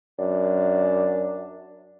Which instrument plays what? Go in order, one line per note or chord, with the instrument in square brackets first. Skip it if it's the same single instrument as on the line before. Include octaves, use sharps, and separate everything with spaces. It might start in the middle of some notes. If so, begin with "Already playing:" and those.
[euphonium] F#2 [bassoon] D4